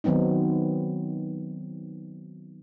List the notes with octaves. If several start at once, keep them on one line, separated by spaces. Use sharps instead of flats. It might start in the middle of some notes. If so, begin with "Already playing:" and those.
D#3 F#3 B3 C4 D#4